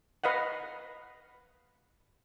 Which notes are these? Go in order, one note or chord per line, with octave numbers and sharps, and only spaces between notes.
B4 D#5 F5 F#5